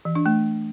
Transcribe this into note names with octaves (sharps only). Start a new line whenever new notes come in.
E3
D4
A3